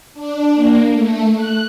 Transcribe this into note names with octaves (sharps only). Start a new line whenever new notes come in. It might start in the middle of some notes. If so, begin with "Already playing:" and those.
D4
A#3
A3
F#6